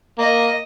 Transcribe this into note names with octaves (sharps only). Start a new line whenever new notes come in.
A#3 D#5